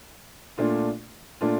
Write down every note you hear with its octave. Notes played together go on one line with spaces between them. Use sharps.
A#2 A3 D4 F4
A#2 A3 D4 F4